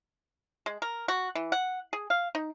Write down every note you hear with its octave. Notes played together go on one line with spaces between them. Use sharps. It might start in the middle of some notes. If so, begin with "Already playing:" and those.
G#3
A#4
F#4
E3
F#5
G#4
F5
D#4